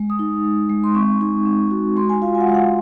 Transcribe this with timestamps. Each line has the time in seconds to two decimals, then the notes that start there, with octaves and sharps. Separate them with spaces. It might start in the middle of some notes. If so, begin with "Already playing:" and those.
Already playing: G#3
0.10 D#6
0.19 D#4
0.44 G#3
0.70 G#3
0.84 C6
0.95 C4 C#6
1.21 D#4
1.46 C4
1.71 F#4
1.96 G#3 C6
2.09 G#5
2.22 F4 F5
2.35 G#5
2.41 F#5
2.47 G#3 F5
2.55 F#5